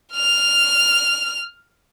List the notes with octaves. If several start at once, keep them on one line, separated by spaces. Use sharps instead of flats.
F6 F7